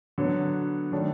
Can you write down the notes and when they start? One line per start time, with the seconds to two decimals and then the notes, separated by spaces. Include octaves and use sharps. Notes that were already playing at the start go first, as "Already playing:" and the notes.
0.18 D3 F#3 B3
0.92 D#3 F#3 A3 D4